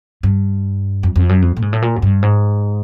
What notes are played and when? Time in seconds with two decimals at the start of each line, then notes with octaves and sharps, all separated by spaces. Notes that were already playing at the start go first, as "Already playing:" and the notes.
0.23 G2
1.03 F2
1.16 F2
1.29 F#2
1.42 F2
1.57 A2
1.62 G#2
1.73 A2
1.82 A#2
1.96 F#2
2.02 G2
2.23 G#2